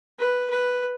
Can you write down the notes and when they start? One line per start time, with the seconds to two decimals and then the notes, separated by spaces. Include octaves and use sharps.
0.19 B4
0.50 B4